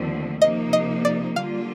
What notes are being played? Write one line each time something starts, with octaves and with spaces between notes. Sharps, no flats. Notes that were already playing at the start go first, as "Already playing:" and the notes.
Already playing: D#2 D3 F3 A3 C4
C3 F3 A#3 D#4 D#5
D#5
D5
D3 G3 A#3 F4 F5